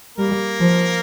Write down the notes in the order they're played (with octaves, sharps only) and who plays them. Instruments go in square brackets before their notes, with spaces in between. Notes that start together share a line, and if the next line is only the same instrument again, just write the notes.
[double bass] G3 [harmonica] A#3 A#4
[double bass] F3